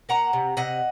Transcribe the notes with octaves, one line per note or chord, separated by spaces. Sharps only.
A#3 F#5 A#5
C3
C3 D#5 F#5